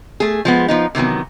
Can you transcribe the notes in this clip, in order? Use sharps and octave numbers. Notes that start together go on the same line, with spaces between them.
A3 G#4
F3 G#3 B3
F3 B3 D#4
C3 D#3 E3 F#3 B3